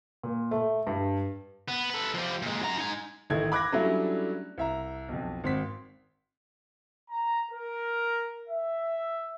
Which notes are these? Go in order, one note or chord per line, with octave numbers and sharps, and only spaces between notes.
A#2
A3
G2
B3
A4 B4
F3 G4
A#2 G#3
F#2 A#5
D#4 G#5
A1 D#3 A3 G#6
B5 D6 F#6 G#6 A#6
F#3 G3 A3 C#4 D4 E4
C2 E5 A#5
B1 F2
G#1 C4 B6
A#5
A#4
E5